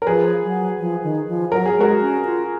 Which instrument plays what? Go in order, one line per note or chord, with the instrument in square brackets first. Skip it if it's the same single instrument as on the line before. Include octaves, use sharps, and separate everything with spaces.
[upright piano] A#4
[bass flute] F3 [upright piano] G#4 B4
[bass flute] F#3
F3
D#3
F3
[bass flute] F#3 [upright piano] A#4
[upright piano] G#4
[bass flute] G#3 [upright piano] F#4 A#4
[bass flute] C#4
F4